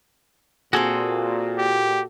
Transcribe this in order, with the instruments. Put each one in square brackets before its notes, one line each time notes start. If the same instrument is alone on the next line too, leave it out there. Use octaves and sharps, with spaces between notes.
[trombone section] A#2 [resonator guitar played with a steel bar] C4 G#4 [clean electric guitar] F#4 A4
[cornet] G4